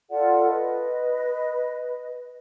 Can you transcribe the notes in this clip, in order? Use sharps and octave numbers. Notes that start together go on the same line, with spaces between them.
F4 A4 D5 F#5
B4 D#5